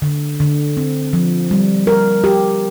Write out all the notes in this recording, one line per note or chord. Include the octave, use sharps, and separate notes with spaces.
D3
D3
C4
F3
G3
A#4
G4